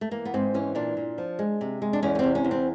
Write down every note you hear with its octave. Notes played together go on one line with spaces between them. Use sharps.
A3
E3 A#3
B3
G#2 C4
E3 C#4
A#2 D4
A#2
F3
G#3
C3
G#3
D4
E2 C#4
C#4
C3 C4
C#4
E2
C4